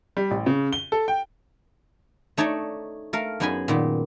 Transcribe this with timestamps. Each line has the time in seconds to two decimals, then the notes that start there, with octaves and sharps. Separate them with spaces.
0.17 G3
0.31 A1
0.46 C#3
0.73 G7
0.92 A4
1.08 G5
2.37 A3 D#4 C#5 D5 A5
3.13 A3 A#4 F5
3.40 F#2 B3 D#4 G#4 G#5 B5
3.68 A#2 D#3 B3